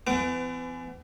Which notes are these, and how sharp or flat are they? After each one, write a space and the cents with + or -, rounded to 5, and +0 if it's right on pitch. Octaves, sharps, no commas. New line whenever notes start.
E3 +30 B3 +45 D6 +0